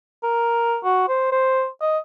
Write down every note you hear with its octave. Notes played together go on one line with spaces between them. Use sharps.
A#4
F#4
C5
C5
D#5